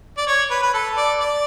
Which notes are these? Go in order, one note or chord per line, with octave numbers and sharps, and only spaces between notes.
D5
C#5
B4
B4
A4
D5
D5